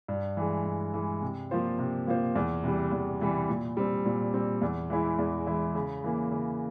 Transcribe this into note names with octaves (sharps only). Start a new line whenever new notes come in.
G2
E3 G#3
G2
E3 G#3
C3
F3 A#3 F4 C5
C3
F3 A#3 F4 C5
E2
C3 E3 G3
E2
C3 E3 G3
A#2
G3 C4
A#2
G3 C4
E2
E3 G#3 E4
E2
E3 G#3 E4
C#3
E3 A#3
C#3